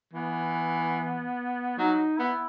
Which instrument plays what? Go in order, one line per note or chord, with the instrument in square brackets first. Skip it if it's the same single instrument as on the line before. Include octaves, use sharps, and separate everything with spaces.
[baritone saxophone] E3 [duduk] B3
[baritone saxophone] F#3 [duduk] D#4
[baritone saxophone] B3 [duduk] E4